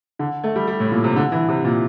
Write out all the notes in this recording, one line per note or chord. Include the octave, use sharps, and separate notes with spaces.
D3
A3
G3
G3
A2
A#2
C3
D3
E3
C3
A#2